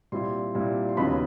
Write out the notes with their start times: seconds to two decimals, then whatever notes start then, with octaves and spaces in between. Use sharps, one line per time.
0.12 A#2 G3 C4 E4 C6
0.55 A#2 G3 C4 E4
0.89 C6
0.97 D#2 C#3 F#3 B3 D#4 B5